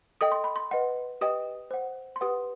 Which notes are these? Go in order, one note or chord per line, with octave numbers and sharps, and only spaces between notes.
A4 D#5 G5 D#6
C6
B5
C6
B4 D#5 F#5
G4 B4 D#5 G5 D#6
C5 F#5
C6
G4 B4 F#5 D#6